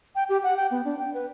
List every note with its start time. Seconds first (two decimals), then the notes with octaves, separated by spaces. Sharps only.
0.15 G5
0.29 G4
0.43 F#5
0.57 G5
0.71 B3
0.85 D4
0.99 G5
1.14 B4